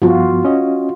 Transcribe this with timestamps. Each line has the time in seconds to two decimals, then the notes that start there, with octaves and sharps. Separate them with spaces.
0.02 G2 F3 B3 F4 F#4
0.45 C#4 D#5